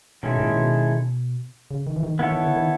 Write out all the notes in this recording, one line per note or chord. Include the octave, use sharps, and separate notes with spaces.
B2 D#3 G#3 C#4 E4 A4
A2
A#2
B2
C#3
D#3
E3
D#3
D#3 B3 E4 A4 C#5
D#3
D3
D#3